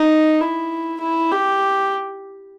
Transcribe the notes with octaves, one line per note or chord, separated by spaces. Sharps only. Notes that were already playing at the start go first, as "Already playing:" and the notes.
Already playing: D#4
E4
E4
G4